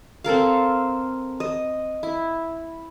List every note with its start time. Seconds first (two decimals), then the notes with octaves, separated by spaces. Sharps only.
0.24 C4 A4 A#4 F5
1.40 D#5
2.03 E4